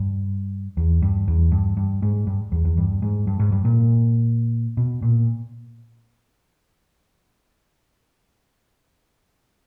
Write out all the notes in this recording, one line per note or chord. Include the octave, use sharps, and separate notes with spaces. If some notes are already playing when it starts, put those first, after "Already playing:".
Already playing: G2
E2
G2
E2
G2
G2
G#2
G2
E2
E2
G2
G#2
G2
G#2
G2
A#2
B2
A#2